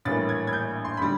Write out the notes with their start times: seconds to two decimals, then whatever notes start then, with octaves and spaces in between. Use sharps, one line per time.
0.05 A#1 A2 E3 G3 A#3 A6
0.29 G#6
0.47 G#6
0.53 G6
0.85 C6
0.97 D3 G3 B5